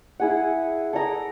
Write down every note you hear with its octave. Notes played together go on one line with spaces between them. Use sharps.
E4 G#4 F#5
A4 D5 A#5 D#6